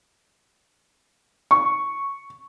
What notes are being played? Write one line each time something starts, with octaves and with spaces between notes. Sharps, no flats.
C#6